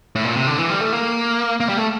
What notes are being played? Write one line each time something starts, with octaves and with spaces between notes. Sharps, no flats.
A2
A#2
C3
D3
E3
G3
A3
A#3
A#3
G3
A3